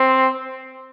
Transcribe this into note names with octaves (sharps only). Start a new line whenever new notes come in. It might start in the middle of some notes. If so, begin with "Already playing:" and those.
Already playing: C4